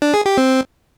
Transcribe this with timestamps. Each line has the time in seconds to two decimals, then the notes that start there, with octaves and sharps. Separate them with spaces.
0.02 D4
0.14 G#4
0.26 G4
0.37 C4